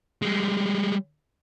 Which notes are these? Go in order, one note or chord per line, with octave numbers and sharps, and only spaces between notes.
G3 G#3